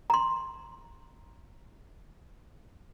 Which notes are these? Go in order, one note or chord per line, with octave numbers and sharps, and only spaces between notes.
A#5 C6